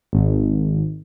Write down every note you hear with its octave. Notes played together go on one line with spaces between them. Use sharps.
G#1